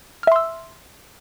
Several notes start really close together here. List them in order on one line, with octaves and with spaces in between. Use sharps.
F6 E5 C6 E6